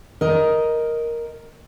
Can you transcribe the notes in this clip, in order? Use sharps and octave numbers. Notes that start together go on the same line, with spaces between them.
A#4 D#5